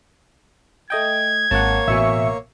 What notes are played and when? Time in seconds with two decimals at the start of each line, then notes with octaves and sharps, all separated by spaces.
0.90 A3 D#5 G5 G#6
1.51 G#1 A#3 C#5 F#5 A5
1.88 A1 B2 E5 G#5 C#6